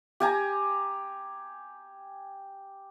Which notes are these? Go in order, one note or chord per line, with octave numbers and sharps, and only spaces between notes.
G4 G#5 A#5